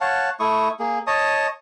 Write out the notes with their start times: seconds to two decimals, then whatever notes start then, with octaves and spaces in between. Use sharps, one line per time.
0.01 C#5 F5 F#5 A5
0.40 A3 E4 C#6 D#6
0.79 A#3 G#4
1.07 C#5 D#5 A5 D#6